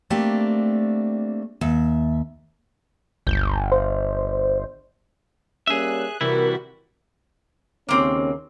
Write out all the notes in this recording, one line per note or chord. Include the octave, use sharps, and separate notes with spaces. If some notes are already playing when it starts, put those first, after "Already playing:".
A3 A#3 C4 D4 G4
D#2 E5
G1 C#2 G6
C5
G3 A#3 C#4 G#4 E5 F#6
C3 E3 G3 E4 F#4 A#4
D#2 C#3 A#3 C4 C#4